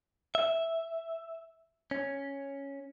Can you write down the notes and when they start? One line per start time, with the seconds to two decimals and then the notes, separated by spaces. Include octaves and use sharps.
0.35 E5
1.91 C#4